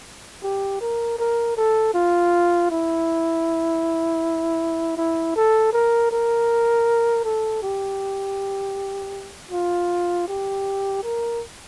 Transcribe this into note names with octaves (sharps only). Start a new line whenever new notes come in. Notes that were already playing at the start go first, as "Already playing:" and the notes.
G4
A#4
A#4
A4
F4
E4
E4
A4
A#4
A#4
A4
G4
F4
G4
A#4